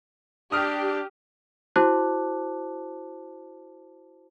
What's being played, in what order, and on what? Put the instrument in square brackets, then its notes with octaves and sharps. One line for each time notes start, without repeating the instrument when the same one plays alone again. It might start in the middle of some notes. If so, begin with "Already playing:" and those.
[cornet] D4 [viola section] G4 [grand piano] D#6 F6
[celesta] E4 F#4 C5 A5 D6 F#6